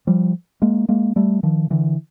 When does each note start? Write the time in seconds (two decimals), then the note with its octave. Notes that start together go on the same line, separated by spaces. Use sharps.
0.07 F3 G3
0.62 G#3 A#3
0.89 G#3 A#3
1.16 G3 A3
1.43 D#3 F3
1.70 D3 E3